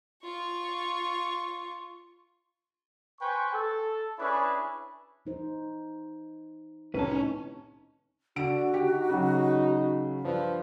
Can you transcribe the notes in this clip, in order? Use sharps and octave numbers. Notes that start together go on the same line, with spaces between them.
F4 C#6
B4 C5 G5 G#5 C#6
A4
C#4 D4 E4 G#4 B4 C#6
E3 D#4 C5
C2 A2 D#3 C#4 D#4 E4 B4 A5
D3 D4 F#4 D7
D#4 G4
C#3 F#3
G2 F3 B4